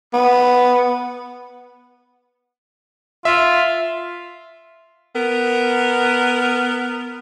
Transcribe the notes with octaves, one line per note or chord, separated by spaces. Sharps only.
B3
F4 E5
B3 A#4